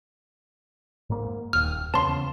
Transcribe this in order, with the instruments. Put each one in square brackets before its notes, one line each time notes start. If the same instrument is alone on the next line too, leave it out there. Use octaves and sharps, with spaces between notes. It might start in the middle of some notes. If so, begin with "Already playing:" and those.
[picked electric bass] G#2 A#3
[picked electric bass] D#1 D#2 [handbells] F6
[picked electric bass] E2 C#3 B3 [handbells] A5 C6